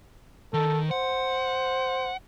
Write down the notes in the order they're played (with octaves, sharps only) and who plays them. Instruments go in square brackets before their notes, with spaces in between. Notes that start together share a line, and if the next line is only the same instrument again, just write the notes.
[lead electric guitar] D#3 [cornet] A4
[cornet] C5 [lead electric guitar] F#5